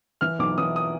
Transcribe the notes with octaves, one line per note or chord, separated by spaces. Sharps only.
E3 F6
B1 D6
E3 D#6
D#6